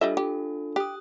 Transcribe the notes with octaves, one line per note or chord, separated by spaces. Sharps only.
G3 D4 F4 A4 D#5 E5
G4
G4 D#6 F#6